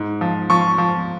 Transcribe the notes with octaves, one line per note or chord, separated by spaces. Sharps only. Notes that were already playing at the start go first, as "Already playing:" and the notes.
Already playing: G#2
F3
F3 C#6
F3